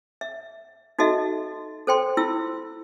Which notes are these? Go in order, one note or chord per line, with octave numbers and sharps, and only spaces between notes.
E5
D#4 F#4 A4 D#5 E5
A4 C5 G5 C6
E4 F4 E6